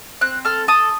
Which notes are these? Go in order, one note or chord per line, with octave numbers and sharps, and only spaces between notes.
C4 F#6
A4 F6
A4 D#6